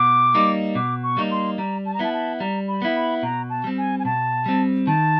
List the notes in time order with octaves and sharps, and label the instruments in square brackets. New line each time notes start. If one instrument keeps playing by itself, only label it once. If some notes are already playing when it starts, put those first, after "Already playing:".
Already playing: [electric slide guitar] B2 [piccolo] D6
[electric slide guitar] G3 A#3 D#4
[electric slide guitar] B2 [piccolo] D6
[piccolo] C#6
[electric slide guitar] G3 A#3 D#4
[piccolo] C6
[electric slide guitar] G3 [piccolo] A#5
[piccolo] A5
A#5
[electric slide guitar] B3 E4 [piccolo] A5
[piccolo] A5
[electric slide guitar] G3 [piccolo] A#5
[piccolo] B5
[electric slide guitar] B3 E4
[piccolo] B5
[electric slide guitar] B2 [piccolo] A#5
[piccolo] A5
[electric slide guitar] G3 C4
[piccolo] G#5
G#5
[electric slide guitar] B2 [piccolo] A5
[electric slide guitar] G3 C4
[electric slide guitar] D#3 [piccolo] A5